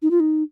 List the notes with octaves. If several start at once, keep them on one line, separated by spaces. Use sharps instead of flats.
D#4
F4
D#4